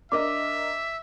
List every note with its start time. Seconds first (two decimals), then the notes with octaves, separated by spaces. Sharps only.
0.12 D4 A#4 D#5 E5 D6